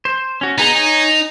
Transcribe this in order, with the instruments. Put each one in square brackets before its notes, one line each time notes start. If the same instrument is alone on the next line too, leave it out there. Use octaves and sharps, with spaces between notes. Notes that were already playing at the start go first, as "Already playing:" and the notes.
[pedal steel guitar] C5
C#4 F#4
[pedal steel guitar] B3 G#4 A#5 [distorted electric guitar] D#4
[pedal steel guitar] C#5 G#5